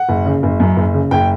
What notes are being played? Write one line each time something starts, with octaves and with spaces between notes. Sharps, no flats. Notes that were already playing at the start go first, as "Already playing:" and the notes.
Already playing: F#5
F#1
C#3
F#1
F#2
F#1
C#3
F#1 G5